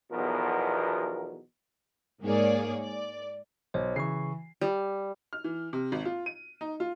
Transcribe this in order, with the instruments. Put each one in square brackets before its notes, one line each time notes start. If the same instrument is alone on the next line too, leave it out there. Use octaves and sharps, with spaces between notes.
[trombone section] B1 E2 B2 F3 A#4
[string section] G#2 A#3 G#4 C#5 D5
D5
[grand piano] B1 [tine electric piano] C5 C#5
[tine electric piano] C#3 C#6 [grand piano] E3 C7
[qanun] G3
[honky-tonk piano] F6
E3
C3
G#1
F4
D#7
D#4
F4